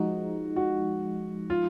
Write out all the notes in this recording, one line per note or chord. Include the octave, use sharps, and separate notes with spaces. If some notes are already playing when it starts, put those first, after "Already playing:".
Already playing: F3 G#3 D#4 F#4
F#4
F4